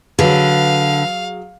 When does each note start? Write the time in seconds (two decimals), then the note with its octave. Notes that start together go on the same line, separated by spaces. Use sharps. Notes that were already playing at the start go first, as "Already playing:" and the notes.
0.19 D3 F#3 G#4 B4 F5